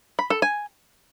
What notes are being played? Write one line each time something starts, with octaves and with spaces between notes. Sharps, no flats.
B5
A4
G#5